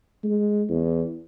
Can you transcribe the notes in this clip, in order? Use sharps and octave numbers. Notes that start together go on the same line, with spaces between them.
G#3
E2